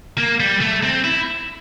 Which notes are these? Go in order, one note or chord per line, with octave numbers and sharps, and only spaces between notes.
A#3
G3
A3
C4
E4